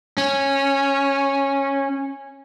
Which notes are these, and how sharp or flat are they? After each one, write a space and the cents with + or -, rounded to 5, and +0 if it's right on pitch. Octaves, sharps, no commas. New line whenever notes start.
C#4 -10